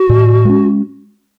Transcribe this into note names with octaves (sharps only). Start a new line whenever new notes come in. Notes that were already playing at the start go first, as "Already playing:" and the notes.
Already playing: F#4
A2
G#3 C#4